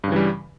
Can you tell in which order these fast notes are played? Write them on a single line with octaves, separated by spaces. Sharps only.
G2 C#3 E3 G3